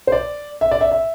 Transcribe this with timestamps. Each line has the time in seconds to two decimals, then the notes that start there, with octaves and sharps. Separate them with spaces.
0.07 C5
0.12 D5
0.61 E5
0.71 D5
0.81 E5
0.92 E5